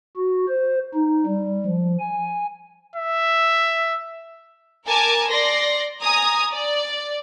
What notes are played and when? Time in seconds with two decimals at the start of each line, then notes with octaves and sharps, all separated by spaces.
0.16 F#4
0.48 C5
0.94 D#4
1.26 G3
1.65 F3
1.99 G#5
2.96 E5
4.88 A#4 G#5 A5 D6
5.30 D5 C6 A#6
6.01 G#5 A#5 D#6
6.52 D5